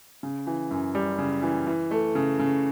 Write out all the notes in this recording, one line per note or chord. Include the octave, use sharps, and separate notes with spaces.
C#3
E3
F#2
G3
C#3
E3
E3
A3
C#3
C#3